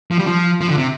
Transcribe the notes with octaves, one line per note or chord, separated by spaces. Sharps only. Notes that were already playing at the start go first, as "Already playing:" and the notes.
F3
G3
F3
F3
D3
C3